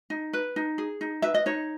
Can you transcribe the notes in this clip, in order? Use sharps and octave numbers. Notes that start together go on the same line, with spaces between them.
D#4
B4
D#4
G#4
D#4
B4 E5
D#5
D#4 C#5